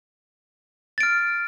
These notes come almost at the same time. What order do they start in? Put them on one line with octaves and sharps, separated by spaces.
A6 D7 F6